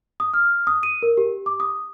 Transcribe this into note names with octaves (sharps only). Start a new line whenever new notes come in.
D#6
F6
D#6
D#7
A#4
G4
D6
D#6